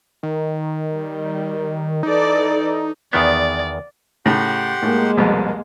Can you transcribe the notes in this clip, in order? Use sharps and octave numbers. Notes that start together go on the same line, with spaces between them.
D#3
G3
E3 D#4 A4 D5
E2 D#3 B3 D5
A2 C#3 G4 F#5 C6
A2 G#3 A#3
C2 F2 B2